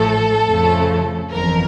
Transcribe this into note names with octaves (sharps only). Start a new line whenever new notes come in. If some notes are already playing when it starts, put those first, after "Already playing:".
Already playing: A1 A2 F3 A3 A4
F2 C#3 F3 A3
G1 F2 E3 A#4